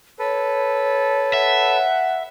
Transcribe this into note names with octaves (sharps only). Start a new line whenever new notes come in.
A4 B4 C#5
E5 F#5